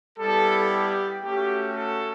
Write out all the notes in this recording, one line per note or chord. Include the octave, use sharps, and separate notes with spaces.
G3 B3 E4 A4
G4
A3 C#4 F#4 G4
A4